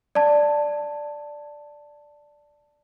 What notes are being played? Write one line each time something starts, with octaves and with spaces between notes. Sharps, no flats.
D5 A5